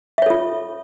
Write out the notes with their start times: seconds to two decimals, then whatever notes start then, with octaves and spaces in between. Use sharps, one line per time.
0.18 E5
0.22 C#5
0.26 A4
0.30 F4